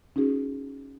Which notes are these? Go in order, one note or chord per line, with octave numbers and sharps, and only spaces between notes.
C#4 D#4 F#4 G#4